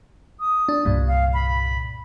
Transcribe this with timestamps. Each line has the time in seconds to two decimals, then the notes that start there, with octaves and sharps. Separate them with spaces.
0.40 D#6
0.69 D4
0.85 C2 G2 A#2
1.08 F5
1.34 B5